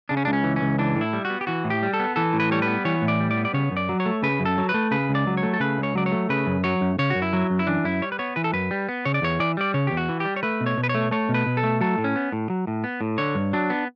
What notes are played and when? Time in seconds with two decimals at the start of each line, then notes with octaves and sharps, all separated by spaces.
0.09 C#3 D4
0.17 C#4
0.25 C#2 D4
0.33 C#4
0.44 E3
0.56 C#4
0.62 C#2
0.78 E3 D4
0.96 A2
1.01 E4
1.13 G3
1.25 F#4
1.30 B3
1.41 G4
1.47 E3 F#4
1.64 A2
1.70 G4
1.83 G3
1.94 A4
2.00 B3
2.16 E3 A4
2.33 A2
2.40 B4
2.51 G3 C#5
2.62 B4
2.67 B3
2.85 E3 C#5
3.02 A2
3.08 D5
3.20 G3
3.31 D5
3.37 B3
3.45 D5
3.54 C#3 C#5
3.71 F#2
3.77 D5
3.89 F#3
4.00 C#5
4.06 A3
4.23 C#3 B4
4.40 F#2
4.45 A4
4.58 F#3
4.69 B4
4.74 A3
4.91 C#3 B4
5.09 C#2
5.15 D5
5.27 F#3
5.37 C#5
5.43 A3
5.54 A4
5.60 C#3 B4
5.78 C#2
5.83 C#5
5.95 F#3 D5
6.06 C#5
6.12 A3
6.29 C#3 B4
6.47 F#2
6.64 F#3 C#5
6.81 F#2
6.99 C#3 C#5
7.10 F#2 F#4
7.22 E4
7.33 F#3
7.50 F#2
7.59 E4
7.67 E3 D4
7.84 F#2 E4
8.02 G3 C#5
8.12 B4
8.19 B3 C#5
8.36 E3 B4
8.44 A4
8.53 F#2 B4
8.71 G3
8.89 B3
9.05 C#3 C#5
9.14 D5
9.22 E2 C#5
9.39 E3 D5
9.57 G3 D5
9.74 C#3 C#5
9.87 E2 G4
9.97 F#4
10.09 E3
10.20 G3 G4
10.36 C#5
10.43 A3 B4
10.61 B2
10.66 C#5
10.78 B2
10.84 B4
10.89 C#5
10.95 A3
11.11 A3 C#5
11.29 B2
11.34 B4
11.46 B2
11.57 A4
11.63 A3
11.81 F#3 A4
11.98 A2
12.04 C#4
12.16 B3
12.32 A2
12.50 F#3
12.67 A2
12.84 B3
13.01 A2
13.18 D3 C#5
13.35 G2
13.53 F#3 D4
13.70 B3